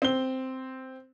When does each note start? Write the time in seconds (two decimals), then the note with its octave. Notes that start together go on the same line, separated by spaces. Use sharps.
0.02 C4 G7